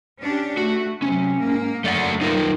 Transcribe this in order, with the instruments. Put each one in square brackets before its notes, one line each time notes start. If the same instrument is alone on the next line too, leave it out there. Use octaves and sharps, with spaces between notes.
[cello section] C#4 D4 G4
[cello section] A3 [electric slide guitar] F#4
[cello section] C3 F#3 [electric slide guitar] C#4
[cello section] G#2 A#3
[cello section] F#2 A#3 [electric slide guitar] A3 D5 F#5
[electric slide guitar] D#4 F4 A#4